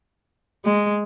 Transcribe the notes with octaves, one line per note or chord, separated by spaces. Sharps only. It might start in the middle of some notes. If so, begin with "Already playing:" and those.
G#3